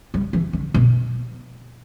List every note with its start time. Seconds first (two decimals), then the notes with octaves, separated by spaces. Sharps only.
0.14 G3
0.33 E3
0.53 D3
0.74 B2